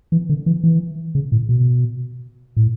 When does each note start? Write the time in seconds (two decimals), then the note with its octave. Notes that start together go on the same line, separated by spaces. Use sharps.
0.12 E3
0.29 D3
0.46 E3
0.64 E3
1.15 C#3
1.32 A2
1.49 B2
2.57 A2